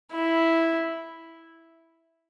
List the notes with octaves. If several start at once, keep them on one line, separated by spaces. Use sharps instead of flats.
E4